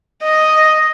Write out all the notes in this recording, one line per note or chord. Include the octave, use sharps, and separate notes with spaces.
D#5